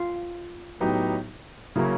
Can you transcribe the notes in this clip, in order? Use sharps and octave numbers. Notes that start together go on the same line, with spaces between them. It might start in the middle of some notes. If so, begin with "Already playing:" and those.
Already playing: F4
A2 F#3 B3 D#4 G4
C#3 F#3 A#3 C#4 E4